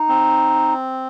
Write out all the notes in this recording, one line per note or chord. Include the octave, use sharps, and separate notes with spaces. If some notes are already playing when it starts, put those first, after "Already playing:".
Already playing: D#4
C4